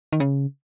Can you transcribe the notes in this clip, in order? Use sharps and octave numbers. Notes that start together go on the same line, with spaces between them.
D#3
C#3